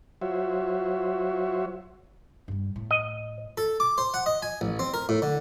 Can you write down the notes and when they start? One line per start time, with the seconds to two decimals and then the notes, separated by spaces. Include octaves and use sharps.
0.22 F#3 F4 F#4 C5 C#5 E5
2.48 G2 G3
2.76 A2
2.91 D#5
3.58 A4
3.80 D6
3.98 C5
4.14 F#5
4.26 D#5
4.42 G#5
4.61 A1
4.79 C4
4.94 A#4
5.09 A2
5.22 D3